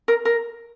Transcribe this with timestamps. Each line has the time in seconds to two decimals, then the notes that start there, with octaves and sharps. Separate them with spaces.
0.08 A#4
0.25 A#4